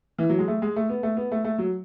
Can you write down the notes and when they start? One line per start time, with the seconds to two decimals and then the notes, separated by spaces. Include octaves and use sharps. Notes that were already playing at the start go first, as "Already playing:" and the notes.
0.18 E3
0.29 F#3
0.39 G#3
0.48 A3
0.62 G#3
0.76 A3
0.89 B3
1.03 A3
1.17 B3
1.32 A3
1.44 A3
1.58 F#3